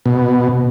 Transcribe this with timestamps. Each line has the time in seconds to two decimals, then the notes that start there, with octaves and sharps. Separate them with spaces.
0.06 B2